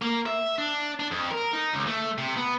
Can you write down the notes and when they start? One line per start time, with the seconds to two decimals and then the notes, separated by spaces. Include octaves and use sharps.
0.02 A#3
0.26 E5
0.58 D4
1.00 D4
1.11 F2
1.31 A#4
1.53 D#4
1.73 C#2
1.87 A3
2.18 C3
2.37 B3